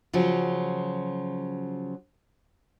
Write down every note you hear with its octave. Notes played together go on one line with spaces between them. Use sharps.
C#3 F3 F#3